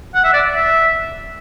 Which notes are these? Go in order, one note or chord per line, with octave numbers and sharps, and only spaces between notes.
F#5
E5
D5
E5